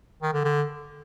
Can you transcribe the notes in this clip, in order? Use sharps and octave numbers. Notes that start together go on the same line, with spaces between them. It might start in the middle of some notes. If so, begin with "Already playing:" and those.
D#3
D3
D3